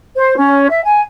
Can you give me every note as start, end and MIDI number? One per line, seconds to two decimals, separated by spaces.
0.15 0.36 72
0.37 0.69 61
0.70 0.82 76
0.83 1.00 80